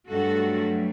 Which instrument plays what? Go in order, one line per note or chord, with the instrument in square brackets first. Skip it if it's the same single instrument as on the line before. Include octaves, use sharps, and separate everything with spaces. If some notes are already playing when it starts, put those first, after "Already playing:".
[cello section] G2 F#3 A3 F#4 A4